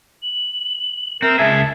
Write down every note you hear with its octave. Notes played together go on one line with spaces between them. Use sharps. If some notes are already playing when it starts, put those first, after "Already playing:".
F#7
C4 A#4 E5
C#2 G#4 E5 A5
A5